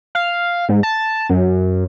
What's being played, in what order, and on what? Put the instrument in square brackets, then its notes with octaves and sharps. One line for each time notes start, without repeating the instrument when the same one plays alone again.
[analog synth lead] F5
G#2
A5
F#2